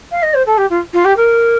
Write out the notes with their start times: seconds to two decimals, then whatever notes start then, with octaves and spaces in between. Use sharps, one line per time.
0.12 F5
0.23 D#5
0.34 C5
0.46 A4
0.58 G4
0.70 F4
0.93 F4
1.05 G4
1.17 A#4